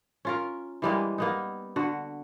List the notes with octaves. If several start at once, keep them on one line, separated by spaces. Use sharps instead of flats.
C#4 F4 A#4
E3 G3 G#3 A#3
A#3 B3 D#4
D3 F#4